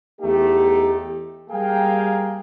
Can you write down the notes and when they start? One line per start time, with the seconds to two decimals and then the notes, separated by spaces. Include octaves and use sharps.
0.20 E2 A3 D#4 G4
1.50 G3 A#3 G#4 A#4 F5 G5